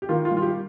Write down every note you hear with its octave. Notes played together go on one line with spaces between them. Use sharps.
G4
D#3 F4
F4
G3
F4
G4